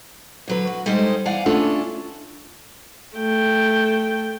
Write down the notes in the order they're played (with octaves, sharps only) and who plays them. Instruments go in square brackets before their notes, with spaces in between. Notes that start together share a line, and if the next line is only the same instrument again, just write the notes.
[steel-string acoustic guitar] D3 F#3 B4
F#4
G3 G#3 D#4 A4 C5
E2 D5 F5 F#5 G#5
A3 C#4 D4 F4 A4
[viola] A3 G5